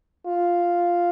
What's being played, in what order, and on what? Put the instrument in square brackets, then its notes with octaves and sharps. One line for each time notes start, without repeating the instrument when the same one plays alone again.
[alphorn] F4